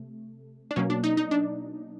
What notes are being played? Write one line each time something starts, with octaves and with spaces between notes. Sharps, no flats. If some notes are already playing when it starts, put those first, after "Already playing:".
Already playing: C3 A3
D4
B2 F#3 A#3 C#4
D4
D#4
D#4
D4